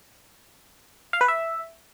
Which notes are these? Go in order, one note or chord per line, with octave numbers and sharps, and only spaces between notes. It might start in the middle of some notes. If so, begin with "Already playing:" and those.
F5
B4
E5